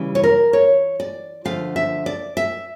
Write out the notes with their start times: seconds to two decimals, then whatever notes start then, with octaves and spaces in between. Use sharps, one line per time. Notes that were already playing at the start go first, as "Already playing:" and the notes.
Already playing: C#3 E3 G3
0.15 C#5
0.24 A#4
0.53 C#5
1.00 D5
1.45 D3 F3 A3 F5
1.76 E5
2.06 D5
2.37 E5